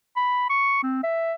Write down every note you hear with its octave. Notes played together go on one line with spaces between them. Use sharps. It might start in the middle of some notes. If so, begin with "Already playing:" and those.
B5
C#6
C4
E5